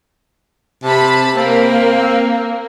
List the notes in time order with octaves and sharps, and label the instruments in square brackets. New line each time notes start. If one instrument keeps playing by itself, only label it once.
[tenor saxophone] C3 [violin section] A5 B5
[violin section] A#3 [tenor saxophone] C4